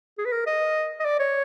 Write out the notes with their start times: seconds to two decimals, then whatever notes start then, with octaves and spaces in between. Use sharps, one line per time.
0.18 G#4
0.25 B4
0.32 A#4
0.46 D#5
1.00 D#5
1.05 D5
1.19 C#5